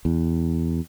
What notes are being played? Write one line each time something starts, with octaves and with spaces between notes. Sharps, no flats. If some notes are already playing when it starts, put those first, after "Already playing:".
E2